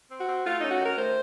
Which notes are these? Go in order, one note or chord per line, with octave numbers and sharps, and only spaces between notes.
C4
F#4
C4
A3 F4
C#4 D#4
F#4
D#3 A#4
A3 C5